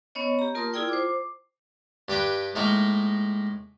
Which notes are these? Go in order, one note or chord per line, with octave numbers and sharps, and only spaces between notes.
B3 C#4 C#5 D#5
G4 A#5
A#3 F4 A#4 A5 C6 D#6
E4 F4 G#4 D5 G5 D#6
C5 D6
G2 G4 B4 G5
A2 G#3 A#3 D#4